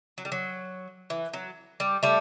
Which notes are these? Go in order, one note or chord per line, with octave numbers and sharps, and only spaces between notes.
F#3
G3
F#3
E3
F#3
G3
G3 A3